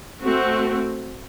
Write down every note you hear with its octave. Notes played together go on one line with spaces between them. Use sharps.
A3 C4 F#4